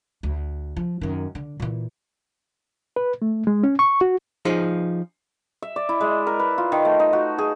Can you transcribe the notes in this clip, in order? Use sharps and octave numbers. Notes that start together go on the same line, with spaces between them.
D2
F3
F#2 D#3
D3
A#2 E3
B4
A3
G#3
C#4
C#6
F#4
F3 D#4 G#4
E5
D5
E4
G#3
A#4
B4
F4
D#3
A3
D#4
F#4
G#4